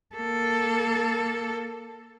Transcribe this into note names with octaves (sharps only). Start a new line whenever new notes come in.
A#3 A4